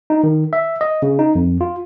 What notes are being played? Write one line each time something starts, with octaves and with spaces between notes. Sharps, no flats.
D#4
D#3
E5
D#5
C#3
D#4
F2
F4